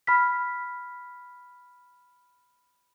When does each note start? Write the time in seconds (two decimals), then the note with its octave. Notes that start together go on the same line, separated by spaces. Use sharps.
0.07 B5 F6 B6